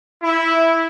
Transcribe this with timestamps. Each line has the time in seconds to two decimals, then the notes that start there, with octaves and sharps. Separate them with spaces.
0.22 E4